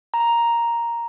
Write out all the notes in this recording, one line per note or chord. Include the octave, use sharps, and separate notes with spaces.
A#5